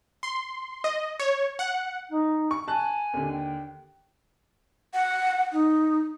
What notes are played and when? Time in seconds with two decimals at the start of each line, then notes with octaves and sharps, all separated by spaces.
0.23 C6
0.84 D#5
1.20 C#5
1.59 F#5
2.10 D#4
2.51 C#6
2.68 G#5 A5 F#6
3.14 D#2 D3
3.32 G5
4.94 F#5
5.52 D#4